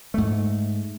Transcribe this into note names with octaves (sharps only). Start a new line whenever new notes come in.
G#2 A3